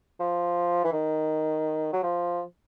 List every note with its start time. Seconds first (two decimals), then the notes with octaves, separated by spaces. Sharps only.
0.20 F3
0.84 E3
0.93 D#3
1.93 F#3
2.03 F3